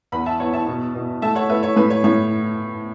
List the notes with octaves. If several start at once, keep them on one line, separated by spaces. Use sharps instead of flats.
E2 F#5 B5
E5 A5
B3 C#5 F#5
E5 A5
B2
B2
A3 E5 A5
C#5 F#5
A3 B4 E5
C#5
A2 B4
C#5
A2 C#5